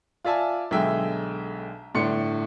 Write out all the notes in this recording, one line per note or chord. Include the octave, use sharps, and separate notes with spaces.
F4 D5 E5 G#5 A5
B1 D3 G#3 E5 G5
G1 A2 D4 C6 C#7